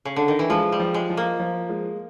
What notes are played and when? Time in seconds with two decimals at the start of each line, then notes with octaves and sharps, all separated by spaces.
0.05 C#3
0.16 D3
0.28 D#3
0.39 E3
0.49 F3 G#3
0.72 G3
0.80 F3
0.94 G#3
1.10 F3
1.17 A#3
1.40 F3
1.69 G#3